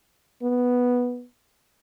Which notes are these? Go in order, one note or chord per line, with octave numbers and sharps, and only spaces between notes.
B3